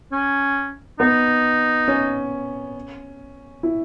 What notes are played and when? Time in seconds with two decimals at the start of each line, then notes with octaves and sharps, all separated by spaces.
0.12 C#4
1.00 B3 D#4
1.88 C#4
3.63 E4